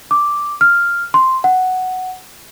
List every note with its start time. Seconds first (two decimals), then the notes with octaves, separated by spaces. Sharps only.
0.11 D6
0.61 F6
1.14 C6
1.44 F#5